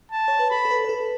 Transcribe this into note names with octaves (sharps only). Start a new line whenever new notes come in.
A5
C#5
B4
A4 B5
A4
B4
B4
A4